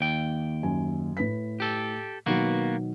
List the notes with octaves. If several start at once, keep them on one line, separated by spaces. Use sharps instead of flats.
D#2 G5
F#2 G#5
A2 B4 B6
G4 A4
B2 D#3 F#3 A#3 B3 F#4